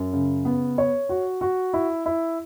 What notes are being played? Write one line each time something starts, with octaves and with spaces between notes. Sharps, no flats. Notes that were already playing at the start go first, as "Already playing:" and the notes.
Already playing: F#2
C#3
B3
C#5
F#4
F#4
E4
E4